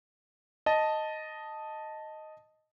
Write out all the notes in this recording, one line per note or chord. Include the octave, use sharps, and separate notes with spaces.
D#5 A5